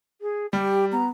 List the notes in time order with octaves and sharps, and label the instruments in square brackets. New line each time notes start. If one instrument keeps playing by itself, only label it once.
[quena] G#4
[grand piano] G3 [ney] G4 [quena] G5
[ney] B3 [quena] A#5